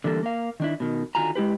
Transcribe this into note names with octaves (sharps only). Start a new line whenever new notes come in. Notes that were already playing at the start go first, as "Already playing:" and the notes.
D3 E3 G3 A#3 A4
A#3 F5
D#3 D4 E4
B2 D#3
D3 D#3 F4 F#4 G#5 A#5
G#3 E4 G4 B4